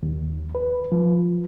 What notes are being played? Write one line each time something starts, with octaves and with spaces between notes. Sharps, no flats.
D#2
B4
F3